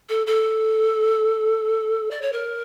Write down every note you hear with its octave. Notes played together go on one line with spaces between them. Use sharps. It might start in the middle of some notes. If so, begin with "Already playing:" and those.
A4
A4
D5
C#5
A#4